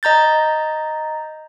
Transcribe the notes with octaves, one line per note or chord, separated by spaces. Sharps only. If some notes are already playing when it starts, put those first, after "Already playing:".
D#5 A#5 G6 A6